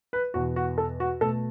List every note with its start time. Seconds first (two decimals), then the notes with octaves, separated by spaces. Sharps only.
0.13 B4
0.34 E2 B2 B3 F#4
0.56 F#4
0.78 A4
1.00 F#4
1.21 B2 A3 A4